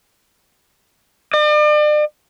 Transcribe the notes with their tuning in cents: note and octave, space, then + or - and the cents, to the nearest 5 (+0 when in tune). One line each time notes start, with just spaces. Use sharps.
D5 +40